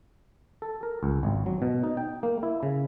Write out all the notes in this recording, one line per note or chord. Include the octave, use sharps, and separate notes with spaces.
A4
A#4
C#2
G#1
F#3
B2
D#4
G5
A#3
E4
C#3